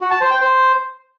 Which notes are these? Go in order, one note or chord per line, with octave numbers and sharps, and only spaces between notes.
F#4
A5
C5
G5
C5